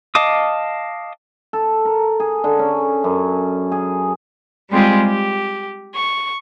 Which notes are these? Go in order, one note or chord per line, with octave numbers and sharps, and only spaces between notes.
D#5 F5 A5 D6 D#6
A4
A#4
G#4
D3
C#4
F#2
G#4
G3 G#3 C4 F4 G4 G#4
G4
C#6